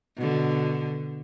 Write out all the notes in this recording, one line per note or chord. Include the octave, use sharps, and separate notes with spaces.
B2 D3